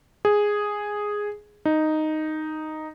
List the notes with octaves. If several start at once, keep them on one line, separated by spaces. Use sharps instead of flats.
G#4
D#4